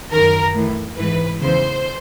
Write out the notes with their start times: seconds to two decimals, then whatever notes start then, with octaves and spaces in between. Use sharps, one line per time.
0.11 F#2 D#3 A#4
0.55 A2 E3
0.97 G#2 E3 B4
1.41 E2 C#3 E3 C5